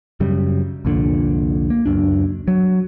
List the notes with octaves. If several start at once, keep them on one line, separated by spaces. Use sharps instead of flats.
F#2 C#3 G3
C2 F2 A#2 D3
A#3
C#2 F#2 D4
F#3